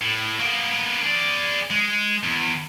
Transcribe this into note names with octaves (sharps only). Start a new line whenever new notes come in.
A2
A#3 B3
G#4 D5
G#3
E2